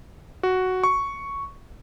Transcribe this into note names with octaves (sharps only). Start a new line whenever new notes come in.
F#4
C#6